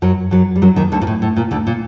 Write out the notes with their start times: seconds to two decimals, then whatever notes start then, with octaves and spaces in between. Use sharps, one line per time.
0.02 F#2 F#3
0.31 F#2 F#3
0.56 G3
0.62 F#2 F#3
0.76 D#2 D#3
0.92 D2 D3
1.02 A#2
1.07 A2
1.22 A2
1.36 A#2
1.51 D2 D3
1.67 A#2